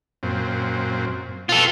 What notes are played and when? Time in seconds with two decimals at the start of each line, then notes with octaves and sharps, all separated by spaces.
0.23 F#2 A#2 C4
1.49 B2 F4 A4